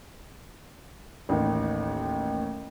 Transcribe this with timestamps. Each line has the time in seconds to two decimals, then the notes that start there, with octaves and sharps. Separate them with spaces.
1.29 A1 D#2